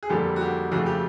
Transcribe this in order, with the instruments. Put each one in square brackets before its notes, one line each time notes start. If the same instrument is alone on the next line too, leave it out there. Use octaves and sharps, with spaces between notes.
[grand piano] G#4
F2 D3 G3 A#3 G4 A4
F#4
G4
F2 C#3 F3 A3 F#4
G4